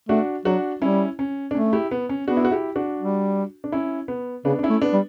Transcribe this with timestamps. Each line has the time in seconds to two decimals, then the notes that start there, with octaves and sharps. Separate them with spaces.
0.09 A3 D4 F#4
0.45 F#3 D4 F#4
0.82 G3 C#4 E4
1.19 C#4
1.51 D4
1.55 A3 C#4
1.73 E4 G4
1.91 B3
2.09 C#4
2.27 B3 D4 F#4
2.37 E4
2.45 F#4
2.51 E4 G4
2.76 D4 F#4
3.00 G3
3.64 D4
3.72 C#4 E4
4.08 B3
4.45 C#3 B3 D4
4.59 D4
4.63 C#4 E4
4.70 A3
4.82 B3 D4
4.93 G3